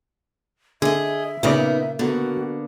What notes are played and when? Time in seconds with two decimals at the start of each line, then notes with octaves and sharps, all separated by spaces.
0.82 D3 G#4 D#5 E5
1.43 A#2 C#3 A#3 B3 D#4 D5
1.99 D3 A#3 B3 F#4